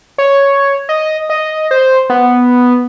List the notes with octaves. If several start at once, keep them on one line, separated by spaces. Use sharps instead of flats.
C#5
D#5
D#5
C5
B3